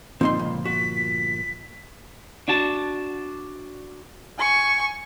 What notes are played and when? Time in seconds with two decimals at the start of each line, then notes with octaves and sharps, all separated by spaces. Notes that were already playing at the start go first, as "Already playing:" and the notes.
0.21 G1 A#2 F3 C4 D#4 C6
0.39 C#2
0.65 F#4 B6
2.48 D4 F#4 A5
4.39 G#5 C#6